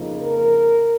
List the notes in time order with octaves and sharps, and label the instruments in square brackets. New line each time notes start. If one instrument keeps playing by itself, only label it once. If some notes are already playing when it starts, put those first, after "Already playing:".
Already playing: [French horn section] F2 C#3 F3 A#3 D#4
A#4